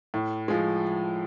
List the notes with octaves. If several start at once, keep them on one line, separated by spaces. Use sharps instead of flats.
A2
F3 G#3